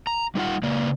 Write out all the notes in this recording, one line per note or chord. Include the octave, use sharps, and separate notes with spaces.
A#5
G3 D#4 F4 F#5
C#3 A#3 D5